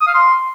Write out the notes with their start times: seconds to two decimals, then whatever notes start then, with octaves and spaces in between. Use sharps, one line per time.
0.01 D#6
0.07 F5
0.14 C6